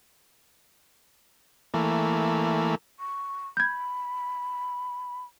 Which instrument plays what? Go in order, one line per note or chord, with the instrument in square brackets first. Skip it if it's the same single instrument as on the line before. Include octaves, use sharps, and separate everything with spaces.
[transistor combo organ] E3 A3 A#3
[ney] C#6
[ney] B5 [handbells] G6 G#6